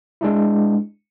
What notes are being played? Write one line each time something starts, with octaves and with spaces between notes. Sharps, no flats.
G#3 D4 E4